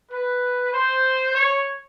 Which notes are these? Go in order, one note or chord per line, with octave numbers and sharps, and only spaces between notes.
B4
C5
C#5